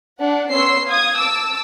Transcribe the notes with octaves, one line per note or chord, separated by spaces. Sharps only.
D4 F#5
B3 C#4 C#5 C6 E6 C7
F5 D#6 G#6
A5 D6 E6